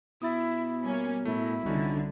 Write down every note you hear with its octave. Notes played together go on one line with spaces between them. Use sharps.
B2 E4 D#6 A6
G3 A#3 C#4
A2 A3 E4
C2 D3 C#4 D#4 F#4